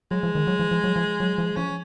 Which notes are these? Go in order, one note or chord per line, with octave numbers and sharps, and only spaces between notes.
F#3 G#3
F3
D#3
F#3
F3
F3
F#3
F3
F#3
F3
F3 C#4